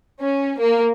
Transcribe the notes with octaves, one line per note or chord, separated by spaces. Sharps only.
C#4
A#3